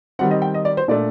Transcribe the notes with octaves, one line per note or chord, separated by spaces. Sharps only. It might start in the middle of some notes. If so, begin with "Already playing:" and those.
D#3 G3 C4 F#5
D#5
G5
D#5
D5
C5
A#2 A3 D4 D5